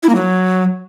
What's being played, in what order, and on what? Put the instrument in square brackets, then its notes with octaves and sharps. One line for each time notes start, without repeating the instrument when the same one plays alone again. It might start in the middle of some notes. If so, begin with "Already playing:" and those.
[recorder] E4
A#3
F#3